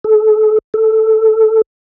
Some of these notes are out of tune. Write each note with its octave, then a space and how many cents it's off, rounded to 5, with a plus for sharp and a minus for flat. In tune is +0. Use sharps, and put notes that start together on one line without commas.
A4 -35
A4 +0